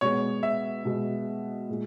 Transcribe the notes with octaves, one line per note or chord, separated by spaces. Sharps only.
B2 G#3 B3 C#5
E5
B2 G#3 B3
A#2 G#3